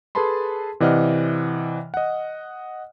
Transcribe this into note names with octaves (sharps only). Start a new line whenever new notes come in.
G#4 A4 B4 A5 B5 C6
C3 E3 D5 D#5 F#5 F6
D#5 F#5